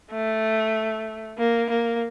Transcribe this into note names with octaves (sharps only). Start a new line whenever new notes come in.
A3
A#3
A#3